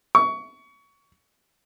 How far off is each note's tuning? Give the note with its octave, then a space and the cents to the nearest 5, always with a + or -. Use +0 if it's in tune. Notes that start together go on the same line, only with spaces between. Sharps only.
C#6 +25